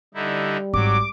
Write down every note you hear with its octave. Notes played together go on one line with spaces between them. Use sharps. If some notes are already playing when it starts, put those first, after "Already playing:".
D3 G3 D#4 E4
G#1 F#3 D6